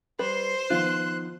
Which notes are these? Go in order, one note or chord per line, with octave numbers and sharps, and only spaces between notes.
G3 B4 C5 C6
D#3 F3 B3 F4 F#6